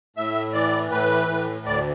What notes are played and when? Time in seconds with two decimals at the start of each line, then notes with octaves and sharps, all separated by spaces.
0.16 A2 E5
0.53 E3 D5
0.92 A2 B4
1.29 A2
1.66 D2 D5